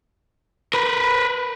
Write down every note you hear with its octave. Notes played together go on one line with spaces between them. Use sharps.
A#4 B4